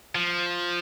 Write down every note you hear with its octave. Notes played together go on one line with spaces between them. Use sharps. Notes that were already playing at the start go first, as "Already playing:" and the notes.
F3